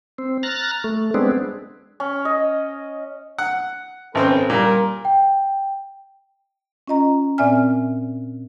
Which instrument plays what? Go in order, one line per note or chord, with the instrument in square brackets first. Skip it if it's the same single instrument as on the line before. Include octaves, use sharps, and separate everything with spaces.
[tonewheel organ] C4
A#5 F6 F#6 A6
A3
G#3 B3 C4 D4
[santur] C#4
D#5
[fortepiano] F#5
[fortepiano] G#1 C4 C5 [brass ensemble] C#4 A4 B4
[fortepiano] A#2 [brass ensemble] G3 A#4
[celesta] G5
[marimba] C#4 F4 D#5 A#5
A#2 C4 D5 E5 G#5 F6